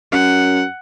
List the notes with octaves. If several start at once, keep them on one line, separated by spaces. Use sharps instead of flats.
F#2 F#5